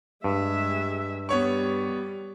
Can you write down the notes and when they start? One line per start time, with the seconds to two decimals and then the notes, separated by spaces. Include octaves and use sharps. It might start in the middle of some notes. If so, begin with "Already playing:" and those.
0.24 G2 G#3 E5
1.29 G3 B3 C#5 C#6